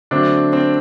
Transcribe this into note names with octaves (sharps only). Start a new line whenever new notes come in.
D3 F#3 A3 C4 D4
C4